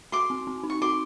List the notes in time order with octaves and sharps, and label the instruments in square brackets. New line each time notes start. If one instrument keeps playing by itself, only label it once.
[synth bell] F#4 [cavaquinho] C6 D6
[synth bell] C4
C4
D#4
[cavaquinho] C#6
[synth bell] F#4 [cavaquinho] C6 D6